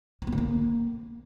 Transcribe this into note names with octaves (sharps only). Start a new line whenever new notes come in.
E3
B3
D3
A#3